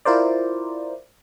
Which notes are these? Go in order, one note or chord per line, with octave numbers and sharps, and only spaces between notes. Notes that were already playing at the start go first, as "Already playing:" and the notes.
E4 F4 A#4 C5 D5